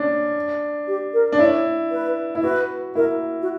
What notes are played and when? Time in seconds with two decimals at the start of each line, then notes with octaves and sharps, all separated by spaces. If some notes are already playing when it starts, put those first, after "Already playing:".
Already playing: C#4 D4
0.87 G4
1.14 A#4
1.32 D4
1.39 E4 C#5
1.91 B4
2.35 E4
2.43 F#4 B4
2.95 E4 A#4
3.42 F#4